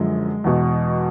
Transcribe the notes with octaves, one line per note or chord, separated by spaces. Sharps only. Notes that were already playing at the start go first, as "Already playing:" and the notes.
Already playing: F#2 D3 F3 G#3
E2 B2